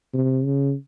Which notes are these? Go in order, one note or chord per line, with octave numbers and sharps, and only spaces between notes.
C3
C#3